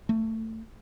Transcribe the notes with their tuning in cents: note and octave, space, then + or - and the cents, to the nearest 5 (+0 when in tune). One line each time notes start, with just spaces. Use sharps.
A3 +20